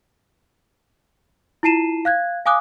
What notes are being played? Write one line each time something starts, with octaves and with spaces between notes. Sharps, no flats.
E4 F4 A5 C7 D#7 E7
F5 F#6 G#6
F5 G#5 D6 D#6 F#6